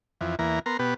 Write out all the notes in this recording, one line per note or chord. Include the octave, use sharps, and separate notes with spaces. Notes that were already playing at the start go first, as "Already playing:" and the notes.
F2 E3
E2 E3 A#3 A#5
B3 A#4 A#5 C6
B2 B3 G4 B4